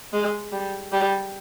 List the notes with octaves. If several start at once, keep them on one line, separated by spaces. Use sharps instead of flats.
G#3
G3
G3